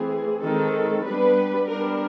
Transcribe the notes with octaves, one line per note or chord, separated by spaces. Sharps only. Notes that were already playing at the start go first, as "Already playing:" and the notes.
Already playing: E3 A3 C4 G#4
D#3 G#3 C4 A4
G3 B3 D4 B4
G3 B3 D4 A#4